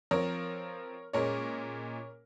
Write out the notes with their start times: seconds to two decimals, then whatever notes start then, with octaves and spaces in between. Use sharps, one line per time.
0.11 F3 C4 A#4 C#5
1.13 A#2 G#3 C#4 A#4 C#5